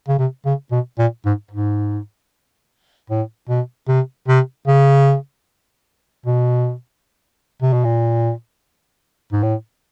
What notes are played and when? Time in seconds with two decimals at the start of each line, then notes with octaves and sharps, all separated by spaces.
0.08 C#3
0.19 C3
0.46 C#3
0.72 B2
0.98 A#2
1.25 G#2
1.51 G#2
3.10 A2
3.49 B2
3.88 C3
4.28 C3
4.67 C#3
6.26 B2
7.62 C3
7.73 B2
7.84 A#2
9.33 G#2
9.43 A2